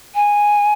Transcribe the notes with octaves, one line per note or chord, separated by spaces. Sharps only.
G#5